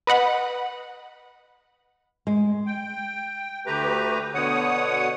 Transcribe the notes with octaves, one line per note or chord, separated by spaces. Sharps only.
B4 D#5 F#5 B5
G#3
G5
D2 A3 G4 B4 A#5
B2 D3 C#5 F#5 D#6